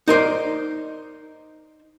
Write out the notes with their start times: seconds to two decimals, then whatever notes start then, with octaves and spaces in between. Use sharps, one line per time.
0.08 D#4 A#4 C5 D5